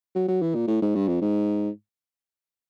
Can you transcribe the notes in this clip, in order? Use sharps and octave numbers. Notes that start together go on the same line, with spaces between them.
F#3
F#3
E3
A#2
A2
G#2
G2
F2
G#2